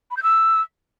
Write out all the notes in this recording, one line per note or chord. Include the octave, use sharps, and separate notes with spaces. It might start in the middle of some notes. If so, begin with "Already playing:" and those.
B5
G6
E6